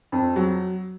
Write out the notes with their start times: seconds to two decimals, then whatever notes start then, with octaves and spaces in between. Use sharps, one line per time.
0.12 F2
0.36 F#3